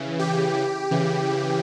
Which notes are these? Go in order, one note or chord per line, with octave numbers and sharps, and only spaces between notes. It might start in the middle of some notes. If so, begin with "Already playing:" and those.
Already playing: C#3 E3
G4
C#3 E3